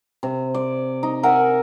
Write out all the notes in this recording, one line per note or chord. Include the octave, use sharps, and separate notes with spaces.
C3
D5
D#4
A#4 E5 F#5 G#5